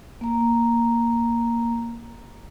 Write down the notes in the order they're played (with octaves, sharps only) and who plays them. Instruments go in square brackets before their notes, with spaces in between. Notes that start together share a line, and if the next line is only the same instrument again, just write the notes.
[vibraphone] A#3 A#5